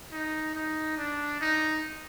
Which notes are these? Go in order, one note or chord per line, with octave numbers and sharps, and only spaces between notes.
D#4
D#4
D4
D#4